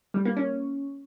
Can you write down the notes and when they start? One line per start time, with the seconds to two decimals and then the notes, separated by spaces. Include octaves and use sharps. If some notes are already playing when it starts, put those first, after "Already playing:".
0.14 G3
0.25 A#3
0.37 C#4